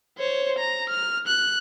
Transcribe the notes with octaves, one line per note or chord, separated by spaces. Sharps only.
C5 C#5
A#5
F6
F#6